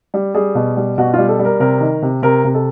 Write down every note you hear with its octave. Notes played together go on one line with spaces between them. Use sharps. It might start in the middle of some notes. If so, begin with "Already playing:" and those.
G3
G3 G#4
B2
G3
B2 F#4
G3 F4
A4
G3
A#4
C3 A#4
D#3
C3
C3 A#4
C3
A4